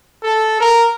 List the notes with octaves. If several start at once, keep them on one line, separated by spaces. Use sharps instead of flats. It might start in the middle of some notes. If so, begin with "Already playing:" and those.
A4
A#4